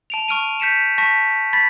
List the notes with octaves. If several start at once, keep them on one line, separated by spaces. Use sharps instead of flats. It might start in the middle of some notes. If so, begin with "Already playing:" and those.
A5 D7 F7
C#6 F6 D7 D#7
G6 B6 C#7 E7
A5 C#6 A#6 B6
B5 A6 B6